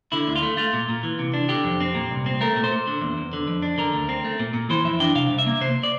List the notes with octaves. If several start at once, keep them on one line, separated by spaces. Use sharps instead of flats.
D3 E4
D2
F4
A3
A3 F4
A#2
A#2
E3
C3
D4
D3 G4
F2
C4
A#2
C2
C4
A3 A#4
A#2
C5
A#2
D3
E2
E2
D3
F2
D4
D3 A#4
D2
C4
A3
A#2
A#2
E3 C5
F2 E5
D4 G5
C3 F5
C2
E5
A#3
C3 C5
D5